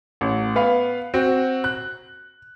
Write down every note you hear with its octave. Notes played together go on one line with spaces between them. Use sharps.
A1
B3 B4 F5
C4 F#4
F#6